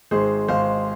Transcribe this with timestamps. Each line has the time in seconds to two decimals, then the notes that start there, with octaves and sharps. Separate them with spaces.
0.11 G#1 G#2 G#3 G#4 C5
0.48 G#1 G#2 G#3 C5 F5